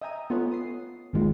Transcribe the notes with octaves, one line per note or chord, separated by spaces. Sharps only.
D#5 E5 G5 G#5 A#5 D#6
B3 F4 A4 B4 C#5 F#5
D#6 C7
G#1 D#2 D#3 G#3 F4